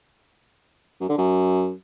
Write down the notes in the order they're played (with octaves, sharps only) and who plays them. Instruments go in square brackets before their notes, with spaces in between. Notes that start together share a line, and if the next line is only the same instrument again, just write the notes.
[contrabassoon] F#2
D3
F#2